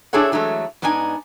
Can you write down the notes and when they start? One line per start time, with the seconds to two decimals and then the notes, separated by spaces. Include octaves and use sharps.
0.13 D4 E4 G#4 A4 C#5 F#5
0.32 E3 F#3 G#3 A3
0.82 G#2 B3 D4 D#4 G#5